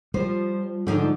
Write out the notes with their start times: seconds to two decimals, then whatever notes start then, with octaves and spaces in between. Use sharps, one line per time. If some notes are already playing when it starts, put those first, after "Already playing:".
0.14 F3 G3 C5
0.87 G#2 D3 F3 D#4